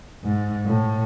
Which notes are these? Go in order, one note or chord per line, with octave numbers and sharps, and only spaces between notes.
G#2
A2